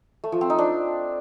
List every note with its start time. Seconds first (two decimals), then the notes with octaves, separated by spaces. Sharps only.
0.24 A3
0.32 F3
0.41 C4
0.50 D#4
0.58 D4